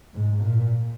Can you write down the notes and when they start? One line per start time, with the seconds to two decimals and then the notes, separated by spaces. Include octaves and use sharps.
0.14 G#2
0.42 A#2